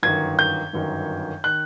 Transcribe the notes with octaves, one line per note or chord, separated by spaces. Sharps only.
G1 F#2 D#3 G#6
G6
G1 F#2 D#3
D#3 F#6